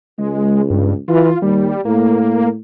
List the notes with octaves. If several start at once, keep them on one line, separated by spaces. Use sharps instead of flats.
C#2 G#3
G2
E3 F4
D#2 G3
A2 A#3